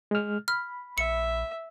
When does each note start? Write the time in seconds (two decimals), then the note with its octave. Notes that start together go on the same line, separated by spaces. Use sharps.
0.11 G#3 F6
0.48 B5 F6
0.98 A#1 E5 C#7